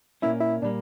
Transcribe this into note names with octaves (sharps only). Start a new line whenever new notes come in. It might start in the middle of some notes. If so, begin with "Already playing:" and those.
A#2 A#3 C#4 E4
E4
A#2 G3 A#3 D4